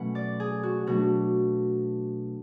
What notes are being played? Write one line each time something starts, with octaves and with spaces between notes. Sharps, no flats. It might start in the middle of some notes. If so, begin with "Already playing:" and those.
Already playing: B2 F#3 A3 C#4 F#5 B5
D5
G#4
F#4
B2 F#3 A3 D4 F#4